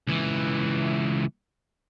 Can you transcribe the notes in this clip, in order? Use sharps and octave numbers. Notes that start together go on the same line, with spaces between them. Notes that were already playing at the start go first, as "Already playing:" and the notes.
C#2 E3